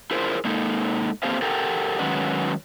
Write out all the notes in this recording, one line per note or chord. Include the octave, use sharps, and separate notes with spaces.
E4 F4 G#4 A#4 C5
G#3 A#3 D#4 A4
A#3 C4 G4 A4 C5 F5
G4 A4 A#4 F#5 G5
D#3 F#3 G#3 C#4 B4 F#5